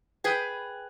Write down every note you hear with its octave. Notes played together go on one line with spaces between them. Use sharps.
G#4 B4 G5